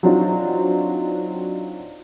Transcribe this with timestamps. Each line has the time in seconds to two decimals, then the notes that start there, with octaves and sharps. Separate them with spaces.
0.03 F#3 C4 D4 D#4 F4 F#4